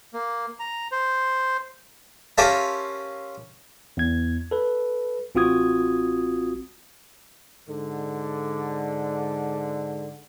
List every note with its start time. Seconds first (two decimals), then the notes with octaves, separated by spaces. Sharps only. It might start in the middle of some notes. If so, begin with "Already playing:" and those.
0.14 A#3
0.59 A#5
0.92 C5
2.38 C#4 F4 G4 A#4 E5 A5
3.97 E2 G#6
4.51 A4 B4
5.35 A1 C4 F4 F#4 D#6 G#6
7.68 G#2 D3